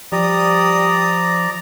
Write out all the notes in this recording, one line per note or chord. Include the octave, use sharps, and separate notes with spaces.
F3 G3 D5 A#5 D#6